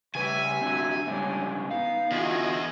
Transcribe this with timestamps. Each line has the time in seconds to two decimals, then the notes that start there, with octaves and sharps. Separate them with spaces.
0.15 C#3 G3 B4 E5 G#5
0.61 C4 D4 F#4
1.07 G#2 C#3 G3 C#4 D4
1.71 B3 D#4 F5
2.11 E2 D3 F4 F#4 G#4 D#5